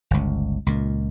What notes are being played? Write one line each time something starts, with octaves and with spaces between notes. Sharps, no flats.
G1 C#2
C#2 A#2